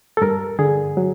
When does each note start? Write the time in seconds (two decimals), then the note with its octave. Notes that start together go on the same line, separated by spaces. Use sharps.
0.17 A4
0.22 G2 A#4
0.59 D3 G#4
0.97 F#3